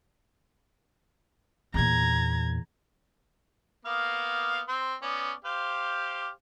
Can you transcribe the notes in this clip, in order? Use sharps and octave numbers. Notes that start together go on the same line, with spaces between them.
E2 A#2 A#5 G#6
A#3 B3 F5
C4 C6
B3 C#4 D5
G4 C5 F5